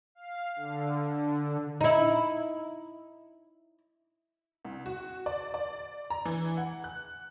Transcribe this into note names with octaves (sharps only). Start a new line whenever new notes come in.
F5
D3
D#4 E4
C2
F#4
D5
D5
A#5
E3
F#5
F#6